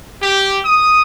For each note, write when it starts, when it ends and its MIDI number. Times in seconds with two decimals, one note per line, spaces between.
0.21 0.59 67
0.65 1.02 87